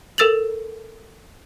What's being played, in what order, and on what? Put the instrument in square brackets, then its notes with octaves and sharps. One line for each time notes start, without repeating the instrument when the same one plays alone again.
[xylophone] A4 A#4 E6 A6 F7 F#7